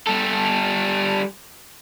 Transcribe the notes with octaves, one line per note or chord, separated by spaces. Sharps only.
G3 A4